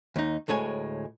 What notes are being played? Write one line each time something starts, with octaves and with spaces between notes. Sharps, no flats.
D#2 D#4
D2 A2 G#3 C#5 G#5